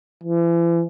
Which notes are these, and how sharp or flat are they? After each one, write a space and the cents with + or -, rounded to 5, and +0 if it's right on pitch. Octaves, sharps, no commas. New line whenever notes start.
E3 +40